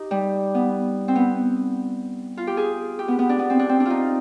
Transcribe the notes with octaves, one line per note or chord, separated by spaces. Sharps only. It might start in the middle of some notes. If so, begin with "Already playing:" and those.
Already playing: D#4 G4
G3
B3
C4
B3
F4
G4
G#4
G4
B3
B3
D4
B3
C4
D4
C4
D4
D#4 F4